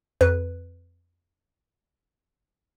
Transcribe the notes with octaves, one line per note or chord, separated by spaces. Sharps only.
F2 B4